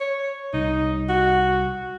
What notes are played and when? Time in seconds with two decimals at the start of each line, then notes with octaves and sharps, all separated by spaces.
0.01 C#5
0.54 C2 D#4
1.09 F#4